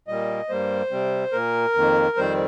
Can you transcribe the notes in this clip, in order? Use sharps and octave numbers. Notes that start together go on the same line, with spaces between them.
A#2 G3 A#3 D#5
G2 G3 A#3 C5
C3 G3 C4
A#2 A#3 A#4
F2 D#3 A#3
F2 D#3 G3 C4 C5